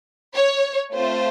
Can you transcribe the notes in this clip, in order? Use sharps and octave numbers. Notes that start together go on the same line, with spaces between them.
C#5
A3 C4 F4 C5